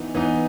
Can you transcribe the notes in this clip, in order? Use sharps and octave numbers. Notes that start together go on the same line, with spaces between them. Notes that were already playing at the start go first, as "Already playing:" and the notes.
Already playing: E3 B3 D#4
E3 B3 D#4